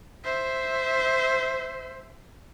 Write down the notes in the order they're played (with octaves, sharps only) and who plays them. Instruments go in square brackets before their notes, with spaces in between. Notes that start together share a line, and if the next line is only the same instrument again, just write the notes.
[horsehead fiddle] C5 E5